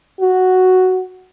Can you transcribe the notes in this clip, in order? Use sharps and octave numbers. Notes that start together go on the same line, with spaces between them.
F#4